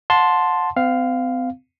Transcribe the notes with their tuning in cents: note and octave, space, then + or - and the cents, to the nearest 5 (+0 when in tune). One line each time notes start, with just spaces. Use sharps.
F#5 -40 A5 +0 C6 +0
C4 -40 F5 +0